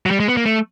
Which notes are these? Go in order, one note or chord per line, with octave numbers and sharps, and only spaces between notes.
F#3
G3
G#3
B3
A#3
A3